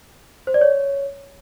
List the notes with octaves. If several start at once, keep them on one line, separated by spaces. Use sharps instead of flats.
C5
D5
C#5